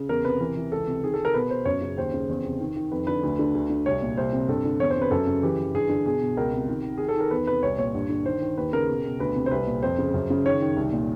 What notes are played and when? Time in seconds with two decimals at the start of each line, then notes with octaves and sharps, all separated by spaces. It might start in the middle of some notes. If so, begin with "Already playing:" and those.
Already playing: C#3
0.09 E2 A#4
0.25 C3 B4
0.40 E3 A#4
0.56 E3
0.72 C#2 A4
0.87 C3
1.03 D#3 G#4
1.14 A4
1.19 D#3
1.25 A#4
1.34 B2 B4
1.50 B2 C5
1.65 F#2 C#5
1.82 C#3
1.97 D#2 C5
2.14 C#3
2.29 E2
2.44 C3
2.60 D#3
2.76 D#3
2.92 F2 B4
3.07 D3 B4
3.23 D2
3.39 D3
3.55 D2
3.70 D3
3.86 C2 C#5
4.02 A#2
4.17 C2 C5
4.33 C3
4.48 G2 A4
4.65 D3
4.80 E2 C#5
4.90 C5
4.96 C3
5.02 B4
5.11 F#2 A4
5.27 C#3
5.43 E3 G4
5.59 E3
5.74 G2 G#4
5.89 D3
6.06 B2 G#4
6.21 B2
6.37 C#2 A#4
6.53 C3
6.68 D#3
6.84 D#3
6.98 D#3 G#4
7.09 A4
7.16 D#3 A#4
7.31 E2 B4
7.47 C3 B4
7.63 C2 C#5
7.78 A#2 C#5
7.95 G2
8.09 D3
8.25 D#3 C5
8.41 D#3
8.58 D#2 B4
8.73 C#3 A#4
8.88 B2
9.05 B2
9.20 D2 B4
9.36 C3
9.46 C5
9.51 C2 B4
9.67 A#2
9.83 F2 C5
9.98 C#3
10.14 F#2
10.30 C#3
10.45 D#3 C#5
10.61 D#3
10.76 C2
10.93 A#2